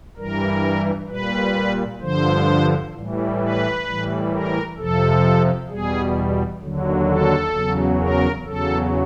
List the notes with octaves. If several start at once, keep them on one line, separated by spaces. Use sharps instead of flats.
G2 E3 G3 A#4
A#2 G3 B4
G2 D3 F3 C5
A2 E3 G3
B4
A2 E3 G3
A#4
F2 C3 F3 A4
E2 B2 G3 G#4
D#2 D3 F#3
A4
E2 C#3 F#3
A#4
E2 C#3 F#3 A4